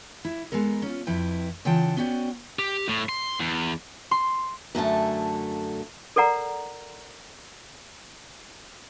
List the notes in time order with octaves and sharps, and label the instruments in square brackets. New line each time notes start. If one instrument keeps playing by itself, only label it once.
[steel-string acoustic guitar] E4
G#3 B3 A4 A#4
C#4 F4
F2 E4 B4 G5
C#3 E3 F4 F#5 G5 A5
B3 C#4 F#4 D5 G5
[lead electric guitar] G4
A2
C6
E2
[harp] C6
[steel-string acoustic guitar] F#2 D3 A3 A5
[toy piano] A4 A#4 D5 F#5 A#5